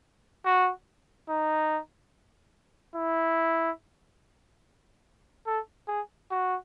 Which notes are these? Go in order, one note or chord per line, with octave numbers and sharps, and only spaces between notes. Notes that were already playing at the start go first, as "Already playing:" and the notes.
F#4
D#4
E4
A4
G#4
F#4